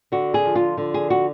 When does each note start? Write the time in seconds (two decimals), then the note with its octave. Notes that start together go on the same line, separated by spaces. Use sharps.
0.12 D3 F#4
0.34 G#4
0.45 F3
0.55 F4
0.77 D3
0.94 G#4
1.10 F#4